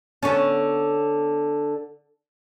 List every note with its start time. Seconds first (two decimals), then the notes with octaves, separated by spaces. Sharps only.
0.23 D3 B3 C#4